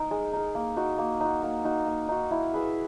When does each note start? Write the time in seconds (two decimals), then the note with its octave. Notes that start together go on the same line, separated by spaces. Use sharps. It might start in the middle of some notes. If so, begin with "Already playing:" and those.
Already playing: D#4 A#4
0.11 G#3
0.33 D#4 A#4
0.55 A#3
0.77 D#4 F#4
0.98 A#3
1.21 D#4 F#4
1.43 A#3
1.65 D#4 F#4
1.87 A#3
2.09 D#4 F#4
2.31 E4
2.53 G#4 B4 E5